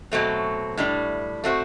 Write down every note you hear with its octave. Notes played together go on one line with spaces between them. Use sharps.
B2 F#3 A3 C4
A2 G3 D4
A3 C4 F#4 C5